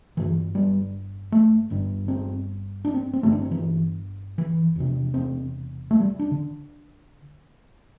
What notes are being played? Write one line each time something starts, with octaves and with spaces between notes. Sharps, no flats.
G1 G2 D3 E3
G3
A3
G1 G2 D3
C4
D4
C4
C4
G1 G2 D3 A3
D4
C4
E3
E3
E1 E2 C3
C4
A3
G3
D4
D3